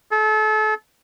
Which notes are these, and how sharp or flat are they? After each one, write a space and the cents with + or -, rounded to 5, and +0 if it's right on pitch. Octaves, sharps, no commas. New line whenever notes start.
A4 -35